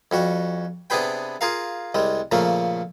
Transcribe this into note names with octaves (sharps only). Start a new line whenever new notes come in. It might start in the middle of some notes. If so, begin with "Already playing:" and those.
F2 G3 F#4
C3 B3 D4 G#4 B4 G5
F4 G#4 A#4 F5
C2 G3 G#3
A#2 C#3 F3 A3 A#3